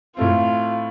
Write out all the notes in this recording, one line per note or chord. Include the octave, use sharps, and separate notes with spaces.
A2 A3 C4 F4